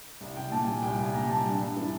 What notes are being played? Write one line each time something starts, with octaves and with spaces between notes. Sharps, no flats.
C2
C2 G5
A#2 A5
G3 G#5
C2 G5
C2 G#5
A#2 A#5
G3 A5
G2
G2
E3